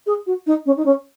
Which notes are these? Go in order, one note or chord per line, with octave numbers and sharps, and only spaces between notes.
G#4
F#4
D#4
C#4
D#4
C#4